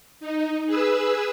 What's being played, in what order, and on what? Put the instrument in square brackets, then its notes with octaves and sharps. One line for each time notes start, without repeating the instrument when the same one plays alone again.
[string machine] D#4
G#4 B4 E6